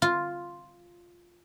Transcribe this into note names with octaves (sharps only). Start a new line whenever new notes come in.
F4